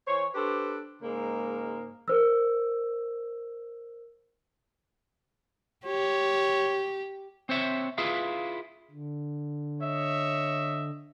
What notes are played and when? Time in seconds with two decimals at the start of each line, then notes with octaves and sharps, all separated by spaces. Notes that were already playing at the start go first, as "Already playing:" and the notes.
0.07 E3 C5 C#5
0.34 D4 G4 A4 B4 C5
1.02 G#2 C#3 G#3 A#3
2.08 A#4 C5 E6
5.86 G4 C#5
7.49 C4 C5 C#5 E5
7.98 E4 F4 G#4 B4 E5 F5
8.91 D3
9.81 C#5 D#5 E5